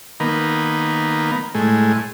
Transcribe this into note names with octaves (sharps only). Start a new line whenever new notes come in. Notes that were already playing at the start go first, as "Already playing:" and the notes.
D#3 A#3 B3
A2 G#3